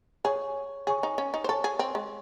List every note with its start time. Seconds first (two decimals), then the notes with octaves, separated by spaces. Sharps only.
0.25 G#4 C#5 G#5 C#6
0.87 G#4 C#5 G#5 C#6
1.03 D#4
1.18 C#4
1.34 D#4
1.44 C5
1.49 A4 C#5 G#5 C#6
1.64 G#4
1.79 C4
1.95 G#3